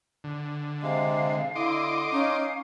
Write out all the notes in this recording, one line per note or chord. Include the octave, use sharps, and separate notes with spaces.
D3
C3 G#3 F5
D3 E4 D#5 C6 D6
C#4 D#4 F5